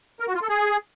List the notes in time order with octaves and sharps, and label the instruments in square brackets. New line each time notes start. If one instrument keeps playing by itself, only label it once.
[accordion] A#4
F#4
F4
A4
G#4